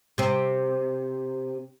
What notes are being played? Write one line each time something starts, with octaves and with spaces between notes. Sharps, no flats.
C3 C4